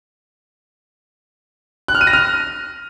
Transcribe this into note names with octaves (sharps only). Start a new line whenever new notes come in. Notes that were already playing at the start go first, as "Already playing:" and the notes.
F#6
F6
D#7
A#6
F6